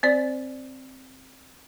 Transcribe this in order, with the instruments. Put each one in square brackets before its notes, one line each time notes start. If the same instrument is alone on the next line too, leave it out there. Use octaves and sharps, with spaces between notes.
[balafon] C4 C5 D5